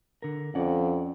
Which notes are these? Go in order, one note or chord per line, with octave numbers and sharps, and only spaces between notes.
D3 A#4
F2 C#4 D5 F#5